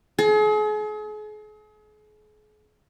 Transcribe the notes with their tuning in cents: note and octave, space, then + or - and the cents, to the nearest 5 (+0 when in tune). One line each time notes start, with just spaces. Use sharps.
G#4 +40